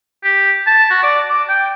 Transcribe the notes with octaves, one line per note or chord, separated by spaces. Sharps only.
G4
A5
F#4
D5
D6
G5